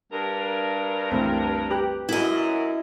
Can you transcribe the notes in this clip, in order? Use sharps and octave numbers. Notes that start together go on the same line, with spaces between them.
G2 A#4
C2 F#2 E3 A3 C4
G4 B4 F#6
F#2 E4 D#5